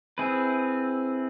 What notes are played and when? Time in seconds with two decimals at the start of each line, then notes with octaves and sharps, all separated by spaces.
0.18 C4 E4 G#4 B4